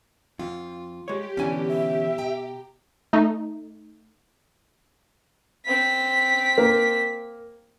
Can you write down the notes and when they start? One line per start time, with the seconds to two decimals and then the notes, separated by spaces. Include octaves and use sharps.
0.39 F2 F4
1.08 G#3 G4 C#5
1.37 B2 D3 E3 C#4 D4 G#5
1.68 E5
2.18 G5 A#5
3.13 A3 D#4
5.66 C4 B6
6.58 A#3